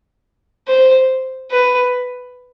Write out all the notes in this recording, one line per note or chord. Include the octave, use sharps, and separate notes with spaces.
C5
B4